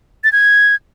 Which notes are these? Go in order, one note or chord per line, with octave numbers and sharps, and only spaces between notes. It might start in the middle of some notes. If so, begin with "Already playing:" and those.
A6
G#6